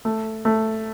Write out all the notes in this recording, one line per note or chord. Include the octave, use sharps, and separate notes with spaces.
A3
A3